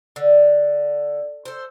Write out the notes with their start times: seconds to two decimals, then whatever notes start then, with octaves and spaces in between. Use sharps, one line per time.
0.16 D3
1.45 A4 C5